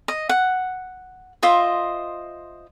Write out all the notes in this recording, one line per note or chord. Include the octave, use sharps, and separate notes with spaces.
D#5
F#5
F4 C5 D#5 E5